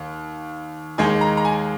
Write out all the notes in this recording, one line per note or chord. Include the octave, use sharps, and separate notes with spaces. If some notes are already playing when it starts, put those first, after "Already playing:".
Already playing: D#2
D#2 D#3 G#3 D#4 G#5
A#5
A#5
G#5